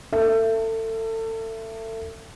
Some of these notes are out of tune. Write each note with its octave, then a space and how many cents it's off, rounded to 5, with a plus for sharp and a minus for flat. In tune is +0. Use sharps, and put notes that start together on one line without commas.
A4 +30 E5 +25